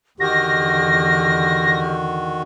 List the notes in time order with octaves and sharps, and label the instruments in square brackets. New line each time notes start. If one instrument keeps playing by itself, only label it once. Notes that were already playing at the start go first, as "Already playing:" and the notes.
[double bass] E2 D3 [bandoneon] D#3 F#4 [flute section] G4 D#5 F6 [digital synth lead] A#6